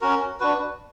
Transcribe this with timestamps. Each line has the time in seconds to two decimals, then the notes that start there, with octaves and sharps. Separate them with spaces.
0.01 C#4 F#4 A#4
0.40 D4 F#4 B4